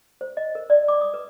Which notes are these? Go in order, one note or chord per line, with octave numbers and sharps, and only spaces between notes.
C5
D#5
A#4
D5
D6
D#6
B4